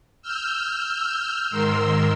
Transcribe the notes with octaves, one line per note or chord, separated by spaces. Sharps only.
E6 F6 G6
G#2 D#3 A#4 C6 E6